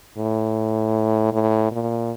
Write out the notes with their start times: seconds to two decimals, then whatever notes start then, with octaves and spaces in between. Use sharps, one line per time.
0.18 A2
1.33 A2
1.71 A#2